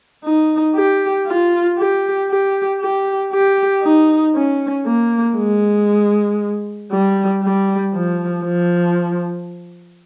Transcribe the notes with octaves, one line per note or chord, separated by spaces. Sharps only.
D#4
G4
F4
G4
G4
G4
G4
D#4
C#4
A#3
G#3
G3
G3
F3
F3